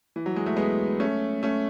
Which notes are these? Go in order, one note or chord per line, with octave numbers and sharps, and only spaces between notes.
E3
F#3
G#3
A3
G#3 B3
A3 C#4
A3 C#4